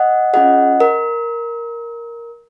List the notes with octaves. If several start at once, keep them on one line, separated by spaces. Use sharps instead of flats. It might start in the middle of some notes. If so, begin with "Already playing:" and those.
Already playing: D#5 F#5
C#4 F4 G#4 D#5 F#5
A#4